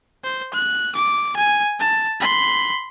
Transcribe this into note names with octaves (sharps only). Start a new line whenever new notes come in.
C5
F#6
D6
G#5
A5
B5 C6